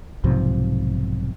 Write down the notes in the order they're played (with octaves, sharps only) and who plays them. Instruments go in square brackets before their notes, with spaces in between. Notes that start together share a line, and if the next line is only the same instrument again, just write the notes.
[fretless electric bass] B1 G#2 C3 F3